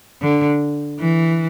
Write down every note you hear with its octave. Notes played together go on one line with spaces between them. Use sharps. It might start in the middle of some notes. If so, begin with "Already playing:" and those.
D3
E3